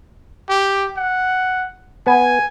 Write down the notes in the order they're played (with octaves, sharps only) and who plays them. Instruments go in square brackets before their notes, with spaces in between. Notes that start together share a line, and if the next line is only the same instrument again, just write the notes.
[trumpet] G4
F#5
[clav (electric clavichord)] B3 [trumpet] G#5